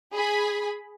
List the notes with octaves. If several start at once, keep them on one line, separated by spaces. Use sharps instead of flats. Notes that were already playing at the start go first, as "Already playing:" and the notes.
G#4 B5